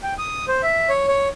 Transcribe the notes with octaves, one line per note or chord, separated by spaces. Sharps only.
G5
D#6
C5
E5
C#5
C#5